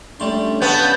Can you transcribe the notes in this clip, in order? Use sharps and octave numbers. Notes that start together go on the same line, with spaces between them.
G3 A3 C#4 D4 G4 C6
B3 C#5 F5 F#5 A5 G6